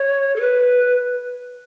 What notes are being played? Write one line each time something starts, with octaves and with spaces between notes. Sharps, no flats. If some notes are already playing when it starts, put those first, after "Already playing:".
Already playing: C#5
A4
B4